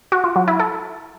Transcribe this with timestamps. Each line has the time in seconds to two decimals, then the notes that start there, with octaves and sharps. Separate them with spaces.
0.12 F#4
0.24 F4
0.36 F#3
0.48 E4
0.59 A4